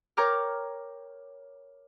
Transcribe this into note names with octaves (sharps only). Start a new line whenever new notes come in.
A#4 C#5 G5 A#5 D6 F6